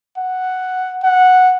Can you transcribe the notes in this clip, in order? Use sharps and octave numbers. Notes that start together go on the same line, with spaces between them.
F#5
F#5